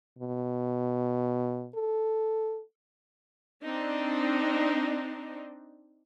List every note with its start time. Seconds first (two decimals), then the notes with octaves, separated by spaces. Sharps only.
0.19 B2
1.75 A4
3.63 C4 D4 D#4